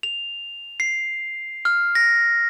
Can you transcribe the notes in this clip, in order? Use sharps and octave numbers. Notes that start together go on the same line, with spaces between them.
F7
C7
F6
A#6